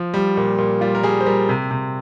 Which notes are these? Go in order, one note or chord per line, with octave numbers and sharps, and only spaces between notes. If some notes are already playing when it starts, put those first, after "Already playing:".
Already playing: F3
G3
A#2
A#2
G3 F4
A#4
G3 G#4
C5
G3 A#4
C3
C3